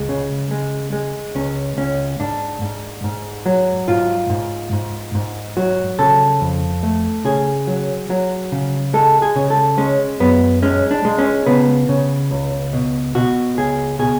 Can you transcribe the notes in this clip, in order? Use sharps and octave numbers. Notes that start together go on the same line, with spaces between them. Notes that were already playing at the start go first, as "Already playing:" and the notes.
Already playing: C#2 G#3
C#3
G#3
G#3
C#2 C#4
C#2 C#4
G#2 D4
G#2
G#2
F#3
G#2 F4
G#2
G#2
G#2
F#3 F#4
C#3 A4
F2
A3
C#3 G#4
F#3
F#3
C#3
G#3 A4
G#4
C#3
A4
G#3 C#4
F#2 B3
G#3 C#4
D4
G#3
C#4
C#3 B3
C#3
C#2
B2
B2 F#4
C#2 G#4
B2 G#4